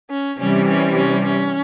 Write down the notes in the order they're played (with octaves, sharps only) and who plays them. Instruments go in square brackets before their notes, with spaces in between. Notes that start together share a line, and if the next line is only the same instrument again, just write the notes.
[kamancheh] C#4
[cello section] C3 E3 G3 [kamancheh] C#4
[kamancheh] C#4
C#4
C#4